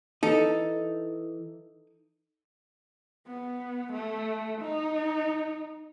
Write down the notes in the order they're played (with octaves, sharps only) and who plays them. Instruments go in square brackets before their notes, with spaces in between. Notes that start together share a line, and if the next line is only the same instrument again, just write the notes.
[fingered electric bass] E3 [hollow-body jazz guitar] D#4 [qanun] A4
[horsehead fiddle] B3
A3
D#4